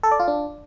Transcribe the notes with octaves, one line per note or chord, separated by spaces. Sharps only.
A4
D5
F4
D4